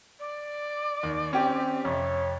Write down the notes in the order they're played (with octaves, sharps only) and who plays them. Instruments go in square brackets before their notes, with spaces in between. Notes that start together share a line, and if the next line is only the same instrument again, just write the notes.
[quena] D5
[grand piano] D#2
[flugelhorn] C4 [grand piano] C#4 G4
[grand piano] F2 C3 [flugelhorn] C#5